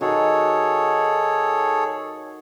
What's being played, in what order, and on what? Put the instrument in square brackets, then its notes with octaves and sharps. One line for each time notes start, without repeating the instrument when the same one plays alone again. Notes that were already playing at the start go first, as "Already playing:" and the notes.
[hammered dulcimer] D#3 F#4 [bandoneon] G#4 A4 C#5